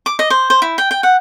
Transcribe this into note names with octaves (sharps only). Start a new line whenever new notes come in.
D6
D#5
C5
C5
E4
G5
G5
F#5